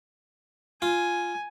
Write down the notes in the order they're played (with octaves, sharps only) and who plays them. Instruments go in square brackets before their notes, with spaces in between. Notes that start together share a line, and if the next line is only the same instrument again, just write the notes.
[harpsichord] F4 [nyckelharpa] G#5